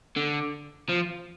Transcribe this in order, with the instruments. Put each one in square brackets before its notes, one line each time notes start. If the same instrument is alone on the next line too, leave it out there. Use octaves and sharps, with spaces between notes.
[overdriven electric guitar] D3
F3